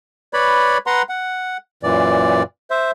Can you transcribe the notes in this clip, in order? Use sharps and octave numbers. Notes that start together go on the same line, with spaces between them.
B4 C#5 D5 B5
B4 F#5 A#5 C6
F#5
F#2 A#2 E3 D5
C5 E5